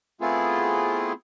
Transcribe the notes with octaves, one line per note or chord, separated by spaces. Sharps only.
A3 B3 C4 E4 F4 G#4